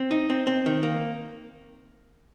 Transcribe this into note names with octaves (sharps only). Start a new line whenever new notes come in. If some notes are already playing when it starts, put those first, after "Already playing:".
Already playing: C4
D#4
C4
C4
D#3
A#3